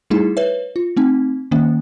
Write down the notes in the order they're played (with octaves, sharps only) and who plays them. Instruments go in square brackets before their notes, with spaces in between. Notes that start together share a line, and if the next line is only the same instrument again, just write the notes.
[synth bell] G3 A3 D#4 E4 G#4
B4 C#5 E5
F4
A3 C4 D#4
D#3 A#3 C#4